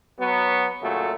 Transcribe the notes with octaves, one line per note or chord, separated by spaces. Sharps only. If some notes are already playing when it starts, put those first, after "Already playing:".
F#3 B3
A#2 C#3 F#3 A3